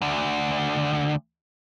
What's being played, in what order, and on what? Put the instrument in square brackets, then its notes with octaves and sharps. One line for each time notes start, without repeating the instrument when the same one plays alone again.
[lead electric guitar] D2 D3